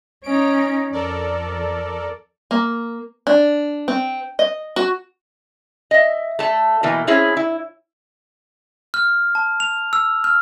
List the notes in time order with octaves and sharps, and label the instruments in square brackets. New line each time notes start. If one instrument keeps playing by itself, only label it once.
[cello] C#4 D#4 [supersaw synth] D7
[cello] F2 [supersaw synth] A4 A#4 D5
[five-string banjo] A#3
D4
C4
D#5
F#4
[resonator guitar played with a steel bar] D#5 E5
A3 A5
B2 E3 A3 A#3
C4 C#4 E4 G#4
E4
[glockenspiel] F6
A5
F7
E6
F6